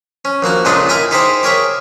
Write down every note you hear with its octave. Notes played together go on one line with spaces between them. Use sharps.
C#4
A#1 A#3 F#4 F#5
C#2 A#2 G#3 D4 A4 D#5
E4 A#4 D#5 E5 G#5
D#4 E4 G4 G#4 C5 D#5
G4 G#4 A#4 C#5 E5